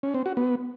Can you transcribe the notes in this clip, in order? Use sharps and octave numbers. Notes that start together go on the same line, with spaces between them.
C#4
C4
F#4
B3